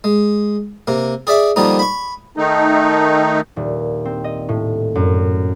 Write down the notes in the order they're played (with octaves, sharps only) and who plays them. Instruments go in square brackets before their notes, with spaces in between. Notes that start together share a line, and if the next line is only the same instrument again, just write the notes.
[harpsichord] G#3
C3 A#3
G#4 D5 E5 D6
D3 D#3 F3 G3 A#3 D#4
B5 C#6
[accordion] D#3 A3 D#4
[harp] D#1
C4
D#5
A2
F#2